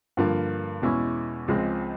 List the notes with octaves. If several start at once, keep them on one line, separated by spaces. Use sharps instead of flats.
G2 D3 F3 A#3
E2 B2 G#3 C#4 E4
C#2 C#3 F3 G#3 C4